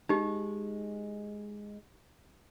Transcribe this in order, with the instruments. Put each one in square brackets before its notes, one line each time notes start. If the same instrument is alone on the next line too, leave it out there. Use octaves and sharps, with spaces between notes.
[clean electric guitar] G#3 [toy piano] D#4 G4